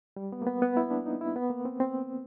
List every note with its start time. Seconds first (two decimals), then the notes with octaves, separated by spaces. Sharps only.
0.17 G3
0.32 B3
0.42 A#3
0.47 B3
0.62 B3
0.77 E4
0.91 D4
1.06 D#4
1.21 E4
1.36 B3
1.50 A#3
1.65 C4
1.80 C4